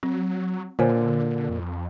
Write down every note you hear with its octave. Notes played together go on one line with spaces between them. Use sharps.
F#3 C4
A#2 D3 C5 C#5 G#5
F2